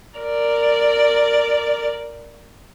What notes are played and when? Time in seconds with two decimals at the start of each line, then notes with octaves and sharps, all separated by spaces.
0.18 A#4 D5